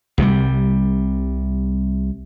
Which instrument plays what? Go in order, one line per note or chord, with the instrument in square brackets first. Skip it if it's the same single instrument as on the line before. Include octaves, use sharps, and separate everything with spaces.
[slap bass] C2 C3 D#3 G3